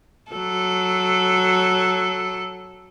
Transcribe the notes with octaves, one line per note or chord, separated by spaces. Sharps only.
F#3 A4